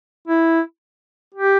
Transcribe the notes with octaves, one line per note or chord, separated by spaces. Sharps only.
E4
G4